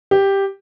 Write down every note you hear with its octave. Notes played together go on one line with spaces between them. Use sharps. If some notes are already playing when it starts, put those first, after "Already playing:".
G4